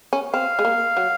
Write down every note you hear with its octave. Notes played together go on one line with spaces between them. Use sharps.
C#4
C4 F5
G#3
A#3
F#3